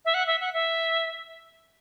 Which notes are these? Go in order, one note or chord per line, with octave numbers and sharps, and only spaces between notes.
E5
F#5
E5
F#5
E5